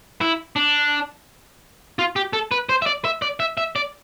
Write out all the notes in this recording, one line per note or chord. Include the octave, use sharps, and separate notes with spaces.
E4
D4
F4
G4
A4
B4
C5
E5
D5
E5
D5
E5
E5
D5